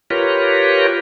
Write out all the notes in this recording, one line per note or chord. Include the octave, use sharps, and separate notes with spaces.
F4 G4 A#4 B4 C#5